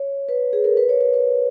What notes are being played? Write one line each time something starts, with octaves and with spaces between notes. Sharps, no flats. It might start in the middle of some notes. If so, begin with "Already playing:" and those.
Already playing: C#5
B4
G#4
A#4
B4
C#5
B4
B4